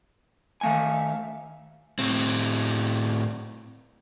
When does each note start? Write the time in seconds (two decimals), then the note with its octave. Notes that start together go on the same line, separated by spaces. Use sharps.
0.61 D#3 A3 E5 F5 G#5
1.99 A2 C4